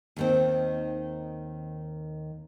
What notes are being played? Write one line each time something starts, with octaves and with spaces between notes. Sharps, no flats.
D#2 D#3 C4